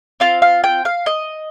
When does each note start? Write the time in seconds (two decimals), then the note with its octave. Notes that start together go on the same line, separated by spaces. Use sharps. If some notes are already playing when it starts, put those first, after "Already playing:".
0.20 C4 F4 F5
0.42 F5
0.64 G5
0.85 F5
1.06 D#5